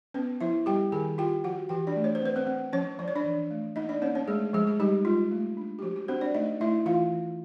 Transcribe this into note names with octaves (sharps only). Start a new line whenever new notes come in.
B3 C#4 B4
F3 E4 E5
G3 G4 G5
D#3 G#4 G#5
F4 G4 G5
F3 F#4 F#5
E3 G4 G5
D4 D5
A3
C#5
C5
C4 B4
C4 C5
C4
F3 C#4 C#5
F3 D5
C#5
D4 D5
E3
A3
A#3 D#4 D#5
D4 D5
A#3 C#4 C#5
C#4 C#5
G#3 A3 G#4
F3 G#3 G#4
G#4
G3 D#4 G4
G#3 F4
A3
D4
G4
F3 F#4
F#4
C4 D4 C5
D4 D5
A3 D#4 D#5
A3 E4 E5
E3 F4 F5
E3